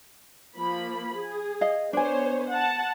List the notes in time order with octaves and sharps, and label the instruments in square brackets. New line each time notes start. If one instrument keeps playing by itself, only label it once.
[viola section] F3 A#3 B5
G#4
[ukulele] D#5 F5
[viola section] B3 C5 C#5 [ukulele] D4 G#5
[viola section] F#5 A5